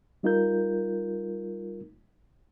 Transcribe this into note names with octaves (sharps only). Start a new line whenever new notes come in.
G3 D#4 F4 A#4 G6